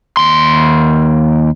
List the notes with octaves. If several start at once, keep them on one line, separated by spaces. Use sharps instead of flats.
D#2 C6